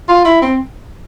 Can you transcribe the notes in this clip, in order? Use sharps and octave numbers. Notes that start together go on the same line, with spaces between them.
F4
E4
C4